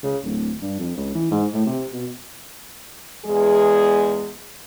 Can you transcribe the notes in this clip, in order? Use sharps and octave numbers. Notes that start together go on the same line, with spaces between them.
C#3
D1
G2
F2
C#2
E3
G#2
A2
C3
B2
E2 G#3 G#4